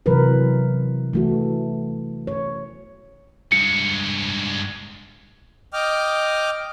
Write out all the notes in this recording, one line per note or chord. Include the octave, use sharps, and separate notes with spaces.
C3 E3 F#3 A#4 B4
E3 A3 F#4
C#5
G2 G#3 C#7
D#5 G5 D6 F6